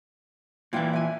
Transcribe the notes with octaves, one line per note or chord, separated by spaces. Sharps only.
A#2 E3 E4 F4 G5
E5 G#5